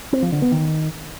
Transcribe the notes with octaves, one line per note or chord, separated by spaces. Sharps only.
C4
F3
D3
B3
D#3